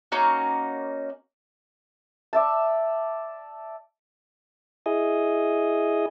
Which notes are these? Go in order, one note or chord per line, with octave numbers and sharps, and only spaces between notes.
A#3 C#4 D#4 F#4
D5 E5 A5
E4 G#4 D#5